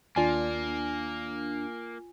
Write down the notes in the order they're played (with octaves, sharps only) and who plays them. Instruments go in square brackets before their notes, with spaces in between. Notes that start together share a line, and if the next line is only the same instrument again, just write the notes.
[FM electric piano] D#2 D4 [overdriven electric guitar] A#3 [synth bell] F4 G#5